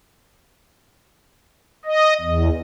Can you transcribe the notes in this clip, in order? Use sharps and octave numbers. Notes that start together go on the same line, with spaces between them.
D#5
E2